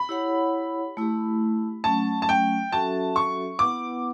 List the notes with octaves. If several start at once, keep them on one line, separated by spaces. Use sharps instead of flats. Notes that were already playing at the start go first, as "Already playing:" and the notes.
Already playing: B5
E4 G4 C#5 F#5
A3 E4 G4
F#3 A3 C#4 A5
A5
G5
F#3 C#4 F#4 A4 E5 A5
C#6
B3 E4 B4 F#5 D6